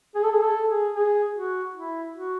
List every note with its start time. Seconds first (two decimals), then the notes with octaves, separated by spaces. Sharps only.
0.15 G#4
0.24 A4
0.32 G#4
0.42 A4
0.69 G#4
0.95 G#4
1.35 F#4
1.74 E4
2.14 F#4